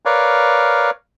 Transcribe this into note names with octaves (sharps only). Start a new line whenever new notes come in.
A#4 B4 C#5 D5 F5